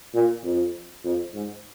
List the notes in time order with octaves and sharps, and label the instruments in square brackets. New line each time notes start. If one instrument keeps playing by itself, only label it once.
[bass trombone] A#2
F2
F2
G#2